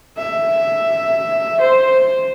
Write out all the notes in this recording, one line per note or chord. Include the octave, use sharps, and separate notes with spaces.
E5
C5